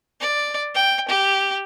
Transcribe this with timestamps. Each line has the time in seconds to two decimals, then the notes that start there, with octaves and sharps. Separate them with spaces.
0.20 D5
0.74 G5
1.09 G4